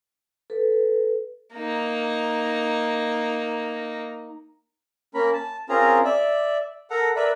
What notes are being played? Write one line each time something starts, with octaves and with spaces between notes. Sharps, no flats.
A4 B4
A#3 D#4
A#3 C#4 A#4 B5
A5
C4 C#4 F4 G#4 A#4 A#5
D5 E5
A4 A#4 F#5 A#5
A#4 B4 D5 E5 B5